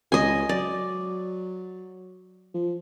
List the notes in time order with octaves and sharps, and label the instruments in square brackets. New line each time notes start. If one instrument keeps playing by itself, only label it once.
[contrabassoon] C#2 [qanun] D#5 G#5
[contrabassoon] F#3 [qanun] D5
[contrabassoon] F3